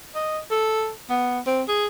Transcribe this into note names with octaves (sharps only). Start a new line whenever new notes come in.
D#5
A4
B3
C4
G#4